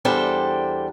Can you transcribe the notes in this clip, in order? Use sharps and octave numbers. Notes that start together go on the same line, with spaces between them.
E2 G3 D4 A4 C5 G5